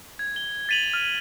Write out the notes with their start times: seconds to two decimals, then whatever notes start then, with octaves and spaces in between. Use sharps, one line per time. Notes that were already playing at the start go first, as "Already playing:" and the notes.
0.19 G#6
0.36 G7
0.69 A6 B6 D#7 F7 F#7
0.94 F6